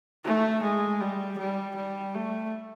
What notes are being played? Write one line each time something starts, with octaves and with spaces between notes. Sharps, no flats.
A3
G#3
G3
G3
G3
A3